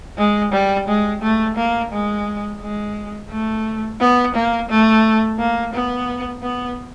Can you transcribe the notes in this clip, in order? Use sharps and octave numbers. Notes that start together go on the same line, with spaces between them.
G#3
G3
G#3
A3
A#3
G#3
G#3
A3
B3
A#3
A3
A#3
B3
B3